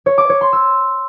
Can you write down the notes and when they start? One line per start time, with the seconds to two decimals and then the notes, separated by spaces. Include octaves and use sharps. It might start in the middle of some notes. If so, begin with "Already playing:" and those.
0.06 C#5
0.18 D6
0.29 C#5
0.41 C6
0.53 E6